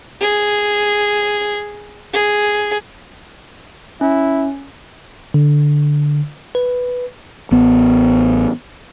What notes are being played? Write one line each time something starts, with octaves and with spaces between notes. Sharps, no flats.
G#4
G#4
C#4 E4
D3
B4
A1 B3